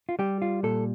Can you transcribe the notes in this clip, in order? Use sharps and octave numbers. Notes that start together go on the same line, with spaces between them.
F4
G3 G4
F4
A#2 A4